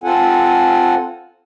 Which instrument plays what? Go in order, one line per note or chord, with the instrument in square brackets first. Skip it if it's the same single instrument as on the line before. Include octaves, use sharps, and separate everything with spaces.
[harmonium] C4 F4 A4 F#5 G#5